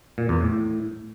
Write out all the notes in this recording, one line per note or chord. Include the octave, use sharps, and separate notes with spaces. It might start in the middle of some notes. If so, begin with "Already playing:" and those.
A#2
E2
A2